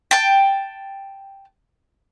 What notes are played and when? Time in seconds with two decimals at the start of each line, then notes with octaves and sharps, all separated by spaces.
0.11 G5 A5